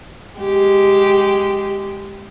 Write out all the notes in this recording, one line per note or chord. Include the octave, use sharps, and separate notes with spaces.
G#3 G4